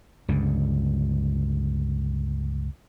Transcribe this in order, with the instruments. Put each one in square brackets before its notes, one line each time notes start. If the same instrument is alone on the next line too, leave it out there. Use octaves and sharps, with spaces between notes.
[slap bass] C#2 G2 D3